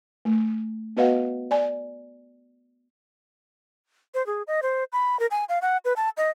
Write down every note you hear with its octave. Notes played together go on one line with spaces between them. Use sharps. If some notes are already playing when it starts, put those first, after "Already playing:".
A3
B3 F#4 B4 D#5 F5 F#5
D5 G#5
C5
G#4
D#5
C5
B5
A#4
G#5
F5
F#5
B4
A5
D#5